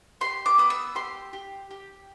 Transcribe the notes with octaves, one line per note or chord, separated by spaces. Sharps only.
G4 C6
D6
B3 D#6
E6
G4 C6
G4
G4